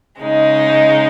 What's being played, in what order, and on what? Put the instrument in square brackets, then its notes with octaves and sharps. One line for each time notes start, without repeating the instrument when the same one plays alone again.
[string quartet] C#3 G#3 D#4